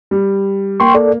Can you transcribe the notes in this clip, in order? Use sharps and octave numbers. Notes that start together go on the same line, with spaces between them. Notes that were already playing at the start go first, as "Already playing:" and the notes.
G3
A#3 G5 C6 C#6
A4 D5